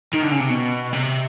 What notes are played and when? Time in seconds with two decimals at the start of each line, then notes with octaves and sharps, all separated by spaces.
0.14 D#3
0.23 D3
0.32 C#3
0.41 C3
0.50 B2
0.93 C3